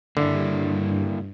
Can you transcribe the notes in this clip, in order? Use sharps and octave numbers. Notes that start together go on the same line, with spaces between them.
G2 D3 A#3 E4